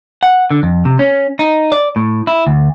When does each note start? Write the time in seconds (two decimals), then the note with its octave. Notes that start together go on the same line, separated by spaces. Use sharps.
0.23 F#5
0.51 D3
0.63 F2
0.85 C3
0.99 C#4
1.39 D#4
1.72 D5
1.96 A2
2.27 E4
2.47 D2